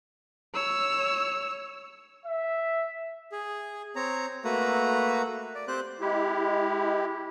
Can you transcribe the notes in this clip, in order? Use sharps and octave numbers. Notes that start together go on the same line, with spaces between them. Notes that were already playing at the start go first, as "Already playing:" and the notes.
C#5 E6
E5
G#4
C4 C#5 A#5
A3 A#3 F#4 B4 A#5
D5
C4 G4 C5 F#6
G#3 E4 G4